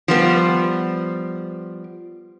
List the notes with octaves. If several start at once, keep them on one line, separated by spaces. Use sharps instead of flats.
F3 G3 B3